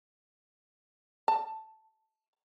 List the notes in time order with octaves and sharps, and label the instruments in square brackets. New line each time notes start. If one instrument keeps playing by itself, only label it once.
[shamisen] A5